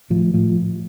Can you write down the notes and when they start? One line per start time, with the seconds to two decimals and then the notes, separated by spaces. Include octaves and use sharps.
0.10 A2 F3
0.34 A2 F3